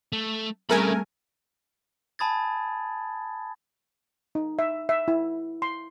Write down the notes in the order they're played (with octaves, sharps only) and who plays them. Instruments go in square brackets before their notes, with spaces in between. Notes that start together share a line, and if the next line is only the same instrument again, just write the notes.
[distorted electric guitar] A3
[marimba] G3 C4 G#4 [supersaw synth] A3 A#4 G#5 [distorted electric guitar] C#4 B5
[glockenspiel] G#5 A5 B5 D#6 G#6 A6
[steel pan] D#4
E5
E5
E4
C6